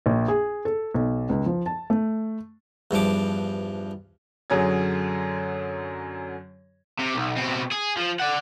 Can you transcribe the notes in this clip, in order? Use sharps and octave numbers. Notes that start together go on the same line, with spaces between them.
A#1
G#4
A4
B1
C#2
F3
A5
A3
E2 G2 F3 D6
F#2 D3 F#3 G#4 G#6
C3
B1
B2 C4
G#4
F3
D5 F#5